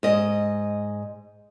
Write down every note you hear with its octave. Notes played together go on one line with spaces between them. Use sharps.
G#2 D#5